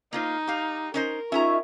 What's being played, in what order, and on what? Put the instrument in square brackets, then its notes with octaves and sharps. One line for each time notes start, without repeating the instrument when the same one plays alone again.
[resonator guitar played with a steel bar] A#3 F4 C5 [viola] D#4
[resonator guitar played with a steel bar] G4 F5
[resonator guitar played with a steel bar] C#4 D#4 C5 [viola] A#4
[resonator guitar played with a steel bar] C#4 G#4 A#5 [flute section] D#4 F4 C#6 [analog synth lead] E5